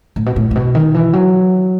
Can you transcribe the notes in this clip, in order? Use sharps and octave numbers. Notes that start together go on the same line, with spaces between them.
A2
B2
A2
A2
B2
D#3
E3
F#3